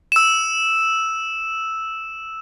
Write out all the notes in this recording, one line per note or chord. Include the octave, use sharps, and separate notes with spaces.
E6 E7